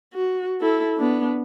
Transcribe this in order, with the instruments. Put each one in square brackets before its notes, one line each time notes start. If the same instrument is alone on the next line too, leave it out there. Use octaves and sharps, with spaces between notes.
[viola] F#4
E4 A4
B3 D4